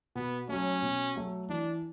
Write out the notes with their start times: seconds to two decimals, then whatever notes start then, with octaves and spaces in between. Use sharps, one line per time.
0.15 B2 B3
0.48 F#3 A3 C#4
0.82 B2
1.16 F#3 A3
1.49 E3 D4